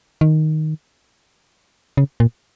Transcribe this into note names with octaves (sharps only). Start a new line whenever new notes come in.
D#3
C#3
A#2